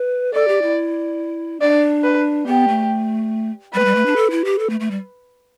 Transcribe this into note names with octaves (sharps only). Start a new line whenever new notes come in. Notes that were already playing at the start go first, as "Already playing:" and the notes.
Already playing: B4
A4 D5
G4
E4
D4 D5
B4
B3 G4
A3
G3 B4
A3
G3
A3
D4
A4
E4
G4
A4
A3
A3
G3